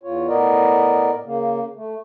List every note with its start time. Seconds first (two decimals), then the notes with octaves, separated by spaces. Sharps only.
0.03 E2 F4 C#5
0.28 A2 B3 A#4 D5 D#5
1.24 C#3 A#3
1.76 A3